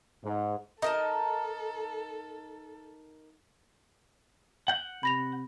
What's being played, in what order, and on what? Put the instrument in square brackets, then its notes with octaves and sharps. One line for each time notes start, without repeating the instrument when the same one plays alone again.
[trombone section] G#2
[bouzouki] D#4 A#4 A5 [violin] A4 [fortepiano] D#5
[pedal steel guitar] F#5 G6
[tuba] C3 [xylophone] B5 A#6 F7